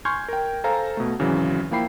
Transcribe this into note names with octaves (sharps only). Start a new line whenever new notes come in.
G#5 C6 C#6 F6 G6 G#6
A#4 G5
A4 C5 F5 G#5 A#5
B2 A3
G#1 C#3 E3 F#3
F3 A#3 E4 G5 B5 C7